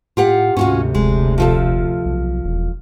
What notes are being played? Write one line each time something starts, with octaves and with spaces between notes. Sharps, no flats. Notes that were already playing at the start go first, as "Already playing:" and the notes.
A2 F4 G4 F#5
D2 G#2 C3 C#4 F4 F#4
F1 G#3
F3 F4 A4
B1
E1